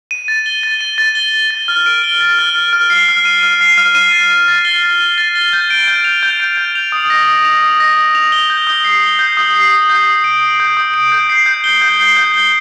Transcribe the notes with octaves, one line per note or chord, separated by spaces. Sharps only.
D#7
A6
G7
A6
D#7
A6
G7
G7
A6
F6
D7
G7
A6
F6
D7
F6
C7
F6
D#7
F6
C7
F6
D#7
A6
D#7
A6
G7
A6
D#7
A6
G7
G6
D7
G6
F7
G6
D7
G6
F7
D#6
A#6
D#6
F7
D#6
A#6
D#6
F7
G7
G6
D#6
C7
G7
G6
D#6
C7
D#6
G6
D#6
D7
D#6
G6
D#6
D7
G6
C7
G6
G7
G6
C7
G6
G7